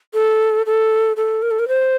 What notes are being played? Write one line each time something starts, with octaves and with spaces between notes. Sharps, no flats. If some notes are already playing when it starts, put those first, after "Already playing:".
A4
A4
A4
A#4
A4
A#4
C5